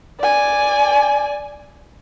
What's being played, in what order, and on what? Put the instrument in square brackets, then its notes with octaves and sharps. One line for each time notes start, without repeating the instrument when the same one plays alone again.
[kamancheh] D5 G#5